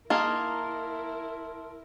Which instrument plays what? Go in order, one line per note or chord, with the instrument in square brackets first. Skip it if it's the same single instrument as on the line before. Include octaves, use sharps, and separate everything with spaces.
[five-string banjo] A#3 D#4 G#4 [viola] E4 A#4 [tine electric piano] A5 C6 F6